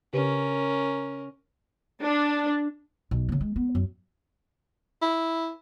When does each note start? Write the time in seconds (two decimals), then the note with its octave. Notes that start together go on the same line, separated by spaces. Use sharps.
0.13 C#3 C#4 G4 A#4 B4
2.03 D4
3.11 B1
3.29 A#2 C#3
3.41 G#3
3.56 B3
3.75 F#2
5.02 E4